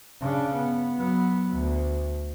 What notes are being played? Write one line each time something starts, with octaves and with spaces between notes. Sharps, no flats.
C#3 D4
B3
F#3 B3
D2